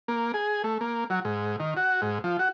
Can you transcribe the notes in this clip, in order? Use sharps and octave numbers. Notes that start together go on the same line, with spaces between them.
A#3
G#4
A3
A#3
F#3
G#2
D#3
F#4
G#2
F3
F#4